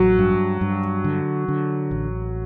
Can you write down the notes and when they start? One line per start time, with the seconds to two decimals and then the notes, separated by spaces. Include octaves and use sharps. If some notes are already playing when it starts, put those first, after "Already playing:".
Already playing: A1 F#3
0.19 G2
0.61 G2
1.04 D3
1.48 D3
1.91 A1